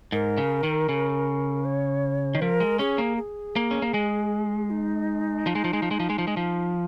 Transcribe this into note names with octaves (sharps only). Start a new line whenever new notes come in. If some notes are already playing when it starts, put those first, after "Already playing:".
G#2 A#4
C#3
D#3
C#3
C#5
D#3
F3 A#4
G#3
C#4 G#4
A#3
G#4
A#3
C#4
A#3
G#3
D#4
F3
G#3
F3
G#3
F3
G#3
F3
G#3
F3
G#3
F3